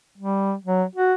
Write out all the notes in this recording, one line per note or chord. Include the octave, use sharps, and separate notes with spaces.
G3
F#3
F#4